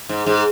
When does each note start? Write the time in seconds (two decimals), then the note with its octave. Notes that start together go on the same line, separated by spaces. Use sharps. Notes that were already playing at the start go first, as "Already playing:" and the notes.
0.09 G#2
0.27 G#2